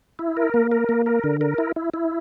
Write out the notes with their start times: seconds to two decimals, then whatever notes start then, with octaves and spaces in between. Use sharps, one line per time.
0.19 E4
0.37 A#4
0.54 A#3
0.71 A#4
0.89 A#3
1.06 A#4
1.24 D3
1.41 A#4
1.58 E4
1.76 E4
1.94 E4